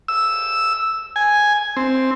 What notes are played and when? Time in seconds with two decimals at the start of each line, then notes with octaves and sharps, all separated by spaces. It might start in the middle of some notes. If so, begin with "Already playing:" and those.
0.08 E6
1.16 G#5
1.77 C4